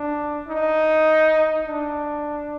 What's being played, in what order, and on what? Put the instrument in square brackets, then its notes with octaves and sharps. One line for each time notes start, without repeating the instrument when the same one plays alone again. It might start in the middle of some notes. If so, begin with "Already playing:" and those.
Already playing: [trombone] D4
D#4
D4